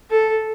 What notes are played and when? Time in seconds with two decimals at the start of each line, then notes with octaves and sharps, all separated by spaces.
0.11 A4